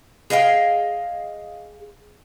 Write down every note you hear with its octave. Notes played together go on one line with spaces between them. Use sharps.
G#4 D#5 F5 G5